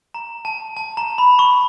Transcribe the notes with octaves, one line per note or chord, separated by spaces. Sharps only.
A#5
A5
A5
A#5
B5
C#6